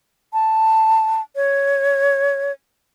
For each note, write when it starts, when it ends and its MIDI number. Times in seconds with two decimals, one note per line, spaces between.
0.33 1.21 81
1.36 2.52 73